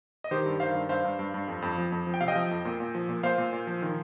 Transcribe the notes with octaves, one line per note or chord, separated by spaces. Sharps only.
D#5
D#3 G4 C5
G2
D#3 C5 F5
G2
G2 C5 F5
G2
G2
G2
F2
F2
F3
F2
F3
G5
C3 F5
D#5 G5
F3
F2
A#2
A#2
F3
A#2
A#2 C5 F5
A#2
A#2
F3
D#3